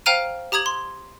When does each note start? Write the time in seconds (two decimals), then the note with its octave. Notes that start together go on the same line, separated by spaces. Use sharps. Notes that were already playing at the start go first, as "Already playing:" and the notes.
0.06 C5 F5 G5 A#5 F6 D#7
0.52 G4 A#5 D#6 G#6 F#7
0.66 C6